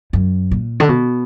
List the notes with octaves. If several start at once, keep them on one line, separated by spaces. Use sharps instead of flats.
F#2
A#2
D3
B2